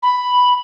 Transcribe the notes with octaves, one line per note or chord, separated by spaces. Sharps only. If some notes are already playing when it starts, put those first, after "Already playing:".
B5